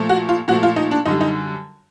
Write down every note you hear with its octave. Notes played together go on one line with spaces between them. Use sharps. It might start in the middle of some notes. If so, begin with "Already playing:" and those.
Already playing: A#2 F3 A3
F#4
F4
A#2 F3 A3 F#4
F4
D#4
D4
F#2 D3 G3 D#4
D#4